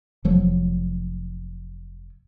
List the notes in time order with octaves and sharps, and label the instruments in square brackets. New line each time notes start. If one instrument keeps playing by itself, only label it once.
[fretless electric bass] F1 F3 F#3